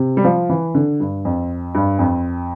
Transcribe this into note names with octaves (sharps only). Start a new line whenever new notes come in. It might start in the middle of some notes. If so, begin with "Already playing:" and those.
Already playing: C3
G3
F3
E3
D3
G2
F2
G2
F2